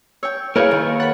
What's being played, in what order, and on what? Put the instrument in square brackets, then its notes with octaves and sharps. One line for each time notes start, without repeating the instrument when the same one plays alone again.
[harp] C#5 G5 [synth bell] E6
[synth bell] A#3 F5 [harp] E4 G#4 B4 [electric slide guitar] A#4 C#5
[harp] D#3
[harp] F#5 B5 [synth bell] A6